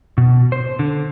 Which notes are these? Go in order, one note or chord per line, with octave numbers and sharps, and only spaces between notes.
B2
C5
D3